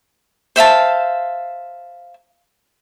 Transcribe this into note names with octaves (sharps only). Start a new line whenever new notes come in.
C5 E5 F5 A5